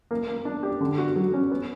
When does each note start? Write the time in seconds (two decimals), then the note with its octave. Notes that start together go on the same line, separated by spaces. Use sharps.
0.11 A#3
0.28 A#3
0.45 D4
0.63 G4
0.81 D3
0.98 F#4
1.16 F#3
1.34 C#4
1.51 B3